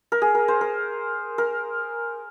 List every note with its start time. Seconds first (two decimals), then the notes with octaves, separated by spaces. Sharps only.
0.12 A#4
0.22 G#4
0.35 A#4
0.48 C5
0.61 A#4
1.38 A#4